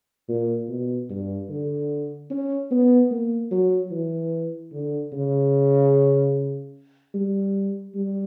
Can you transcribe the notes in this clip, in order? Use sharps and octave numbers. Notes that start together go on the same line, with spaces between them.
A#2
B2
G2
D3
C#4
B3
A#3
F#3
E3
D3
C#3
G3
G3